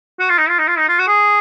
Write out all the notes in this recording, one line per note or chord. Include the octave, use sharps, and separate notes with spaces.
F#4
F4
D#4
F4
D#4
F4
D#4
F4
F#4
G#4